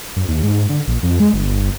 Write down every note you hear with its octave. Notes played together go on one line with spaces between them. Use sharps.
F#2
D#2
G#2
D3
A#1
F2
G#3
G1